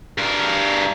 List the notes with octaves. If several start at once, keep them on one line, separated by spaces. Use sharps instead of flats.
G2 A#4